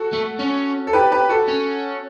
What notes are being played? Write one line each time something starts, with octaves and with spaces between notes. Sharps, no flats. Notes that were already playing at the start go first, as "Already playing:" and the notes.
Already playing: F#4 A4
A3
C#4
A4
G4 B4
G4 B4
F#4 A4
C#4